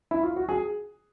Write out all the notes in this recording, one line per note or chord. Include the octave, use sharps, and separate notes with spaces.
E4
F4
F#4
G#4